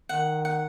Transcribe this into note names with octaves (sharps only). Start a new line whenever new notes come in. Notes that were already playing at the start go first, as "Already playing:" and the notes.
D#3 F#5
F#5